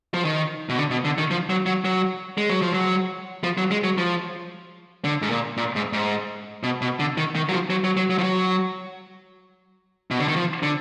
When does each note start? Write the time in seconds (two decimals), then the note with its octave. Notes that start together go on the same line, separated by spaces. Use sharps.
0.14 F3
0.25 D#3
0.69 B2
0.77 D3
0.91 B2
1.05 D3
1.18 D#3
1.31 F3
1.50 F#3
1.66 F#3
1.85 F#3
2.38 G#3
2.50 F#3
2.62 F3
2.74 F#3
3.44 F3
3.58 F#3
3.71 G#3
3.84 F#3
3.98 F3
5.04 D3
5.22 G#2
5.30 A#2
5.57 A#2
5.76 G#2
5.93 G#2
6.63 B2
6.81 B2
6.99 D3
7.17 D#3
7.35 D#3
7.49 F#3
7.52 F3
7.70 F#3
7.84 F#3
7.97 F#3
8.10 F#3
8.19 F3
8.23 F#3
10.11 B2
10.20 D3
10.28 D#3
10.36 F3
10.63 D3